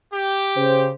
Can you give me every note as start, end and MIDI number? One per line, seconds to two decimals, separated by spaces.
0.13 0.89 67
0.57 0.92 49
0.57 0.92 72